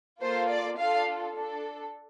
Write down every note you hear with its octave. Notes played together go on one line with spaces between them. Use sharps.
A#3 F4 A4 C5
D5
D4 F4 A4 F5
D4 A4